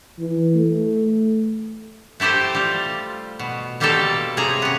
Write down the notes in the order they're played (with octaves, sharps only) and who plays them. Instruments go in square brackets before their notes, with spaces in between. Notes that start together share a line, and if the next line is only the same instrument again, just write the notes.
[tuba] E3
A3
[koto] A3 E4 G4 A4 C5
G3 F4
B2
B2 G3 A#3 F4 G4 A4
C3 G#4 C#5 A#5
B3 C#4